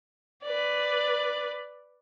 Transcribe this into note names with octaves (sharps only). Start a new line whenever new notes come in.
B4 D5